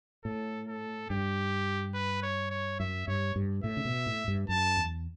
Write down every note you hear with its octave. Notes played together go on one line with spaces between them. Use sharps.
A2 A4
A4
G2 G4
B4
C#5
C#5
F#2 E5
G2 C#5
G2
A2 E5
C#3
B2
A2
G2
F#2 A5
E2